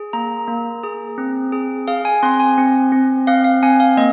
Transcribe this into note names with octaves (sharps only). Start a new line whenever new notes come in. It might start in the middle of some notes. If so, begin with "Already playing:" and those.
Already playing: G#4
A#3 A#5
A#3
G#4
C4
G#4
G#4 F5
G#5
C4 C6
G#5
C4
C4
C4 F5
F5
C4 G#5
F5
A#3 D#5